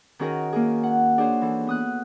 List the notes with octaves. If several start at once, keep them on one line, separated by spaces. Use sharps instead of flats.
D#3 C#4 F#4 G#4 A#4
A#3 G#4
F#5
D4 G#4 C5 C#5
E3 A4
B3 D#6 F#6